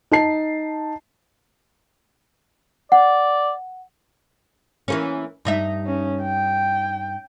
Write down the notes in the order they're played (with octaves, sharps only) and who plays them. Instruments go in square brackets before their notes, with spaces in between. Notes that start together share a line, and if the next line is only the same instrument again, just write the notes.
[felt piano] D#4 A5 C7
[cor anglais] D5 [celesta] F#5
[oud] E3 A#3 C#4
G2 D#4 E5
[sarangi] C#4
G5